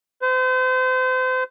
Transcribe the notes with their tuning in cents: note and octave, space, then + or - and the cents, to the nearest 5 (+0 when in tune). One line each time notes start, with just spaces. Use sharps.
C5 -35